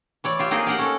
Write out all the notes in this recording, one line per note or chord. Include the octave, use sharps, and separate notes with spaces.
E3 C#5 D5
F4 G4 E5
A#3 C4 D#4 F4 G#4 D#5
G4 A#4 F#5
C#4 A4